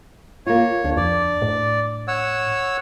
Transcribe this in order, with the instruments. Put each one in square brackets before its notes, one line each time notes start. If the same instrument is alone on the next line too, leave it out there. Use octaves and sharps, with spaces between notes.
[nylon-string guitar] A#3 F4 [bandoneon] C#5
[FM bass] D2 [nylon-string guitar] D4
[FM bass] F2 [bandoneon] D5
[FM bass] A2
[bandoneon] C#5 F#5 E6